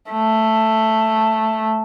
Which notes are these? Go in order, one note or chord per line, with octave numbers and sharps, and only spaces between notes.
A3